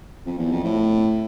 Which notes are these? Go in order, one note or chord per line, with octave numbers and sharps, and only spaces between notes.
F2
E2
F2
A2